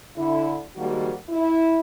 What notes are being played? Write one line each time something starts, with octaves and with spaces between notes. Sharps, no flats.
D3 E4
D#3 F3 G3 G#3 A#3 F#4
E4